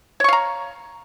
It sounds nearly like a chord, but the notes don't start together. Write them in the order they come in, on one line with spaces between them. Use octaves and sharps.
C#5 C#6 F5 A#5